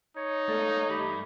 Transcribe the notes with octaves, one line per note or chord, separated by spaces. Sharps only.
D#4 C#5 G#6
A3 A#3 A4 D5
G2 E3 G4 B5